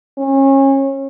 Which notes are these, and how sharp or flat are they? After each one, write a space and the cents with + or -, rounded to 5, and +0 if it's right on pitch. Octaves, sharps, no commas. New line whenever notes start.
C#4 -30